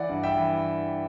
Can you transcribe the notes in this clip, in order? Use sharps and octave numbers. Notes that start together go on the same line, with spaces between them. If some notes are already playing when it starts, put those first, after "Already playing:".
Already playing: E3 D5 F#5
G2
E5 G5
E3